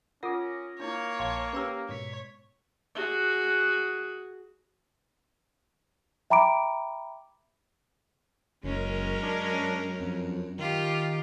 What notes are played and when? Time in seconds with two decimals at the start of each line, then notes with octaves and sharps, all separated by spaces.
0.23 C#4 F4 A#4 F#5 D6 D#6 A#6
0.80 A#3 D4 E4 C#5
1.19 A#1 F5 G5 A5 C6
1.53 C#4 G4 B4 A#5 E6
1.89 G#2 B2 C#5 B6
2.95 F#4 G#4
6.30 E5 G5 A#5 B5 D6 D7
8.64 F#1 F#2 G#3 C#4 A#4
9.23 D4
10.00 F2
10.59 D#3 F4 G4